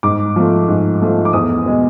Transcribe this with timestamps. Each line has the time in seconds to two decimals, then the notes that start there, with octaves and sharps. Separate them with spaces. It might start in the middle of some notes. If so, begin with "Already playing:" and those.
0.03 G#2 D6
0.36 F3 A3
0.68 G#2
1.02 F3 A3
1.25 D6
1.33 E2 D#6
1.66 B2 G#3